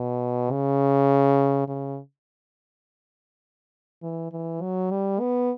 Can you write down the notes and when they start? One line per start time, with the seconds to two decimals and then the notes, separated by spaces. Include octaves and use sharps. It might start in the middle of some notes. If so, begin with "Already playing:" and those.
Already playing: B2
0.51 C#3
1.68 C#3
4.02 E3
4.32 E3
4.61 F#3
4.91 G3
5.20 B3